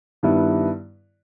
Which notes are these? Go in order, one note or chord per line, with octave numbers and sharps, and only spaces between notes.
G2 D#3 G3 B3 E4